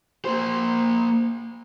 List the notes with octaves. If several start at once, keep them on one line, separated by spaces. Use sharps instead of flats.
A#3 C5